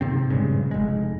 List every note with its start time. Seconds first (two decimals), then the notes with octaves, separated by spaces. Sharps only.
0.01 G#2 C3 C4
0.30 A#1 G2 C#3 G#3
0.71 F1 G#3